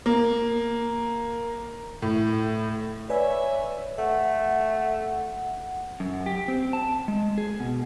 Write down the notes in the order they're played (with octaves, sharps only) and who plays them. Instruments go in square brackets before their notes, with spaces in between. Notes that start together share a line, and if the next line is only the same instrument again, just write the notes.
[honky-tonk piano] A#3
A2
[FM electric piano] B4 D5 G#5 [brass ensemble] C#5 E5
[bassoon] A3 [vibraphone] F#5
[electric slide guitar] F#2
G4
C4
A5
G#3
G#4
B2